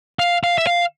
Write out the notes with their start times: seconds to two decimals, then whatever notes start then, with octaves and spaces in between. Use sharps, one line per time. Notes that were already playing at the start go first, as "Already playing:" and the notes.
0.20 F5
0.44 F5
0.58 E5
0.67 F5